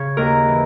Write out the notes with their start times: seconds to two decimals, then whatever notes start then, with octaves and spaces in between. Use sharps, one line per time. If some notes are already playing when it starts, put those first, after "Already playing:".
Already playing: C#3 C#5
0.17 D#2 A#4
0.48 E3